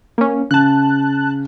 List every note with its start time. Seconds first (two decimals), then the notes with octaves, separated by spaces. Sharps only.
0.18 A#3 C#4
0.51 C#3 A5 F#6